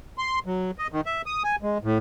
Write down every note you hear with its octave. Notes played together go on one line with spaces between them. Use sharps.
C6
F#3
D#5
D#3
E5
D#6
G#5
G#3
A2